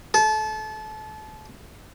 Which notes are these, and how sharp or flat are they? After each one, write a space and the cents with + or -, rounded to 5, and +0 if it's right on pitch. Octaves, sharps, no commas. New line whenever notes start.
A4 -30